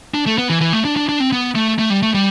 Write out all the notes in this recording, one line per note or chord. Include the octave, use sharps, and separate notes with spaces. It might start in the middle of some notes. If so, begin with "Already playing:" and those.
D4
A3
B3
E3
E3
A3
D4
D4
D4
C4
B3
A3
A3
G3
A3
G3